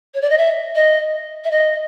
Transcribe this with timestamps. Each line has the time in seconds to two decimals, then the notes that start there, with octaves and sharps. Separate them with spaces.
0.14 C#5
0.21 D5
0.30 D#5
0.38 E5
0.75 D#5
1.44 E5
1.51 D#5